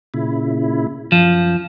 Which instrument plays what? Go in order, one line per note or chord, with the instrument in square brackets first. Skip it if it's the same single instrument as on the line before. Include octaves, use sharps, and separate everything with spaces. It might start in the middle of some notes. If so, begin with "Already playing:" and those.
[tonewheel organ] A#2 C#3 E4
[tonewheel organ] F#2 [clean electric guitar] F3